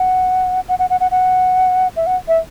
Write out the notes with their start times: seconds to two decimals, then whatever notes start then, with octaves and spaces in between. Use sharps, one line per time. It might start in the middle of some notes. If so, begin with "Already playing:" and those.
Already playing: F#5
0.69 F#5
0.79 F#5
0.90 F#5
1.00 F#5
1.11 F#5
1.96 E5
2.07 F#5
2.28 E5